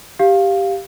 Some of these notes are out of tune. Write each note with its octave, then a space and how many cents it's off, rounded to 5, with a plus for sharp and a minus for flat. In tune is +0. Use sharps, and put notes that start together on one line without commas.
G4 +0 F5 +0